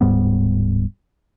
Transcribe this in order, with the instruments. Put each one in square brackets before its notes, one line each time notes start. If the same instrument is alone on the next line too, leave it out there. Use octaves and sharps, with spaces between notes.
[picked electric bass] D1 G#2 G3 B3